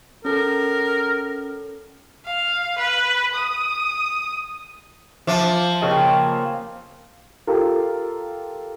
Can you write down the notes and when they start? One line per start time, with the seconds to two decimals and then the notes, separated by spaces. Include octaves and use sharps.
0.25 C#4 A4 A#4
2.25 F5
2.78 B4
3.34 D#6
5.27 F3 E5 D6 F#6
5.81 C#3 A#3 C4 G4 G#4 D#5
7.47 F4 G4 A4 A#4